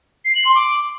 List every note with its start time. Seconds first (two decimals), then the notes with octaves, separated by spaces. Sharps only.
0.25 C7
0.35 F#7
0.45 C6
0.55 D6